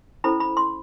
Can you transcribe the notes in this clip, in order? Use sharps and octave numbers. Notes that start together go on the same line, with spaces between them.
C#4 E4 A4 C5 B5
B5
C6